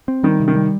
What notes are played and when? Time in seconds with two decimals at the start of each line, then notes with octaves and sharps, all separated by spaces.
0.08 C4
0.23 D#3 G3
0.40 C3
0.48 D#3
0.56 G3